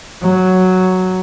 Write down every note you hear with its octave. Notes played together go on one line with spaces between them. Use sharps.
F#3